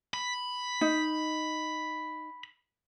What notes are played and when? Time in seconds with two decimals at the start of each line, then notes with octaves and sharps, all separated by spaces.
0.14 B5
0.81 D#4